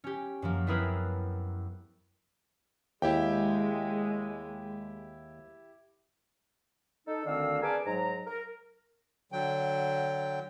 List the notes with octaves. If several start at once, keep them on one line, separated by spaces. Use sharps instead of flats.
C#4 G4
F#2 F3 A#3
B3 C4 E4 G#4 A#4 B4
D#2 G#3 E4 G4 G5
D#4 A4
D2 D3 D#3 C4 F5 E6
G#4 A#4 B4 D5 G#5 A5
G#2 F#3 A#5
A#4
D3 F#3 G5